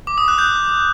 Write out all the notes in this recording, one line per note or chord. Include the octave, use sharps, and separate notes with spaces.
D6
D#6
F#6
G6